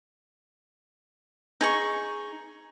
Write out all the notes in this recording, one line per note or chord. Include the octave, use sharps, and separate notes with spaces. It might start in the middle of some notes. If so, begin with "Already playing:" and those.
D#4 G#4 C#6